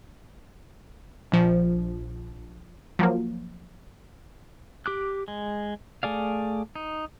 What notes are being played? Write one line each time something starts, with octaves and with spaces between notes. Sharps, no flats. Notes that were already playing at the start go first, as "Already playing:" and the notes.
A#1 F3
F3 F#3 A#3
G4 D6 F#6
G#3
A3 G#4 D5 F5
D#4